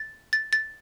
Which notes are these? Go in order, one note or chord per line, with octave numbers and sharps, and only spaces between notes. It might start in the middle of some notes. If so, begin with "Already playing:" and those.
Already playing: A6
A6
A6